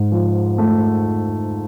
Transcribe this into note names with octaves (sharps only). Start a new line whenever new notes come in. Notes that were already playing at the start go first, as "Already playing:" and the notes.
Already playing: G#2
F3
A3